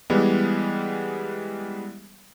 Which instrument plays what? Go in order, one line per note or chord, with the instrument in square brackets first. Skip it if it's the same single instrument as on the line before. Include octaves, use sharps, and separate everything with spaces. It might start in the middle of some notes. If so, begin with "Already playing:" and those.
[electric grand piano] E3 G3 G#3 B3